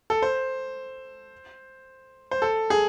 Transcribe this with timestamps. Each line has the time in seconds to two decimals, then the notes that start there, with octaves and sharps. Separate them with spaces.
0.10 A4
0.22 C5
2.31 C5
2.42 A4
2.70 G#4